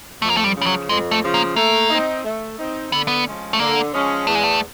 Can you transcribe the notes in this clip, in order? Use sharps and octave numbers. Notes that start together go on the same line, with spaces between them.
F2 A3
A#3
A3
G3
C#3 F3
G3
F#3
F2 G#3
A3
C#3 F3
A#3
A3 A#3
C4 D#4
A3
C4 D#4
D3 B3
B3
F3 G#3 C#4
A3
D3 A#3
F3 G#3 C#4
E2 A3
G#3
A3